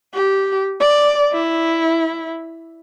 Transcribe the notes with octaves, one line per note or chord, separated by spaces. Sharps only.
G4
D5
E4